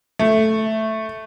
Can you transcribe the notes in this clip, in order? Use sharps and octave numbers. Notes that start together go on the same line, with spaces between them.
A3